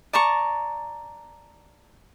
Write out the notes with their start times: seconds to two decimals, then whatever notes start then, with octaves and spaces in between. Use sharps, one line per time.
0.13 D5 A5 A#5 C#6